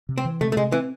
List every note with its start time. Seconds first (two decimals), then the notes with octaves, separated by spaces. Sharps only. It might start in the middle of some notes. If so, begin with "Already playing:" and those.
0.09 C3
0.18 C4
0.25 E3
0.41 C3 A3
0.52 A3
0.57 C3 G#3
0.72 E3 C4